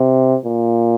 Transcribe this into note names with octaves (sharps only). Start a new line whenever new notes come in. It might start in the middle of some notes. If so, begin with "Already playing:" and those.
Already playing: C3
A#2